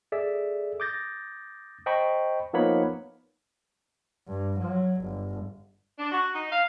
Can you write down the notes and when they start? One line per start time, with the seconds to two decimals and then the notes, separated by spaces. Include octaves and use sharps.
0.12 G#4 A4 D5 E5
0.80 D6 D#6 G6 A6 A#6
1.86 C5 D#5 G5 A5 B5 C#6
2.53 F3 A#3 B3 D#4 C#5 B5
4.28 G2
4.59 F#3
5.01 G1
5.99 D4
6.12 F#4
6.35 D#4
6.51 F5